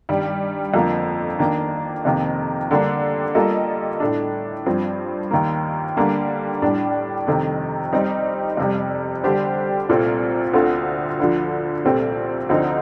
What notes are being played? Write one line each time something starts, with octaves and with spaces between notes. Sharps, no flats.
G2 D#3 G3
F2 D3 F3 A#3
D#3 A#3 D4
F2 C3 D#3 A#3
D3 G3 A#3 D4
G3 A#3 F4 A4 D#5
A2 A3 D4
G2 F3 C4
D#2 D#3 A#3
D3 G3 A#3 D4
A2 G3 D4
F2 C3 D#3 A3
G3 C4 D#4
F2 C3 G3
D3 G3 D4 G4 C5
C2 A#2 A3 C4 F4
D2 D3 A3 C4 F4
D2 D3 F3
C2 A#2 A3 C4 G4
D2 D3 F3 C4 D#4